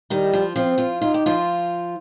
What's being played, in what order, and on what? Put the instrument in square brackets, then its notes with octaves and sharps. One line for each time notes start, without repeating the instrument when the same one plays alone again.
[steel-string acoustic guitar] D#3 D#4 [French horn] G3
[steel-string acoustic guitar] F3 F4
[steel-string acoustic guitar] F3 F4 [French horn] C4
[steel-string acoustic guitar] F3 F4
[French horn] D#4 [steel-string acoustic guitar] F4
[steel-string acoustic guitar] G4
F3 F4